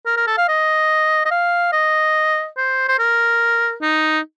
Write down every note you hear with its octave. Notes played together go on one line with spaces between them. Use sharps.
A#4
A#4
A4
F5
D#5
D#5
F5
D#5
C5
C5
A#4
D#4